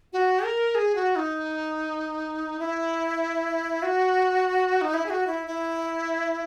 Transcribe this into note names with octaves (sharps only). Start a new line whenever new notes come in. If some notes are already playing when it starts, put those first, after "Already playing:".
F#4
A#4
G#4
F#4
D#4
E4
F#4
D#4
E4
G#4
F#4
E4
E4